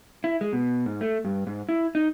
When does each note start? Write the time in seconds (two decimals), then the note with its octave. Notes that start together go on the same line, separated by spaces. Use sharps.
0.24 E4
0.41 G#3
0.53 B2
0.86 G#2
1.01 A3
1.25 G2
1.47 G#2
1.69 E4
1.95 D#4